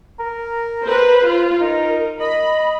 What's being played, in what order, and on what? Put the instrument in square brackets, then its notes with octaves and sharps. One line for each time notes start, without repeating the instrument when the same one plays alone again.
[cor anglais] A#4
[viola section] B4 C5
F4
[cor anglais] D#4 [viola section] A#4
[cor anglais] D#5 [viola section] B5